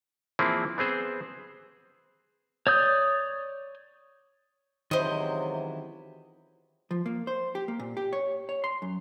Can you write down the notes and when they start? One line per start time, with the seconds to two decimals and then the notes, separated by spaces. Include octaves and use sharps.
0.39 E3 F3 A#3 C4 E4 G#4
0.78 B3 C4 G#4 C5
2.67 C#5 D5 D#6 G6
4.91 C#2 C3 D#3 E3 F#3 E4 C5 D#5
6.91 F3
7.06 A#3
7.27 C5
7.55 G4
7.68 A#3
7.80 A#2
7.97 G4
8.13 C#5
8.49 C#5
8.64 C6
8.82 F#2